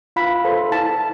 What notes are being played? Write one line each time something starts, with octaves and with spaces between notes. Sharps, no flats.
F4 B5
A4 C5
E4 A5